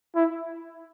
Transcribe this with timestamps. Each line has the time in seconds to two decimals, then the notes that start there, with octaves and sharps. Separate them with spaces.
0.16 E4